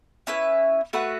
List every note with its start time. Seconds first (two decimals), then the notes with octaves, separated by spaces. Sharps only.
0.27 C#4 E4 B4
0.93 A3 F#4 B4 F#5